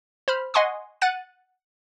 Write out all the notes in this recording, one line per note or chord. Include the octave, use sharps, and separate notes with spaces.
C5 B5 F6
D#5 F#5 G#5 C6 C#6 D#6
F#5 F#6 A6 D#7